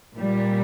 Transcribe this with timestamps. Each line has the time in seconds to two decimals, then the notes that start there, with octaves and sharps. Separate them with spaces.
0.16 A#2 G3